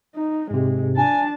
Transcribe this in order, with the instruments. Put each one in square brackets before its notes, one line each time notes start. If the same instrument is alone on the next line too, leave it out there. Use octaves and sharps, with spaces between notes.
[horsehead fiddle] D#4
[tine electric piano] G#2 C3 [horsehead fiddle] G#3
[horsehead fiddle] D4 A5 [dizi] G#5